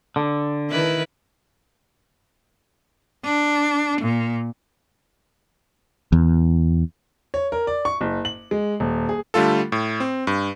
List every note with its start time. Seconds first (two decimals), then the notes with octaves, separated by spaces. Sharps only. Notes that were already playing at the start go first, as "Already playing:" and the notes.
0.16 D3
0.70 D#3 E4 B4
3.25 D4
4.01 A#2
6.12 E2
7.34 C#5
7.52 A#4
7.67 D5
7.85 C#6
8.01 F#1
8.25 F#7
8.51 G#3
8.80 D#1
9.09 G#4
9.34 D3 G3 A3 F4 A4
9.72 A2
10.00 C4
10.27 G2